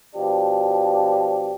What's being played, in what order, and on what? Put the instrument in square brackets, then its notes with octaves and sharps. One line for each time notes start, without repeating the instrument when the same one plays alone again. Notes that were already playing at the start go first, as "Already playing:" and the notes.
[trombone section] B2 F3 D4 G4